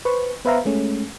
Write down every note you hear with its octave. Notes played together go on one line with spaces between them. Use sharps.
B4 C5 C#6
B3 B4 C5 E5 F5 A#5
G#3 A3 C#4